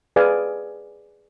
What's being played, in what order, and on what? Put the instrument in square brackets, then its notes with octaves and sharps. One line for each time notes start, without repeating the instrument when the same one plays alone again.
[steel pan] G#4 B4 D5 F5 G#5